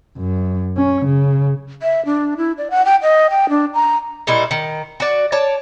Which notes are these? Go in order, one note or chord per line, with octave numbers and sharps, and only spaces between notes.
F#2
C#4
C#3
E5
D4
E4
D5
F#5
G5
D#5
G5
D4
A#5
A#2 G3 D#4 E4
D#3
F#4 D5
C#5 D5 A5